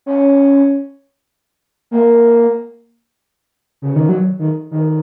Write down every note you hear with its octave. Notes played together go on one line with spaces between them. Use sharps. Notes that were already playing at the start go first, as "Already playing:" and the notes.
C#4
A#3
C#3
D#3
F#3
D#3
D#3